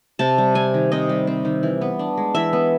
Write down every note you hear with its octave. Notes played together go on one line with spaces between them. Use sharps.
C3 A5
G3
C4 G#5
D#3
C3 D#5
G3
C4
D#3
E3
B3
D4
G#3
E3 E5
B3